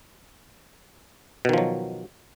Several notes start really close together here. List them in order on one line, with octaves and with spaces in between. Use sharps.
B2 D#3 F3 F#3